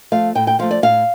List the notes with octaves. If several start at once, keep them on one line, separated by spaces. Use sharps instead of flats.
F3 A3 F5
A2 G5
G5
F3 A3 F5
D5
A2 F5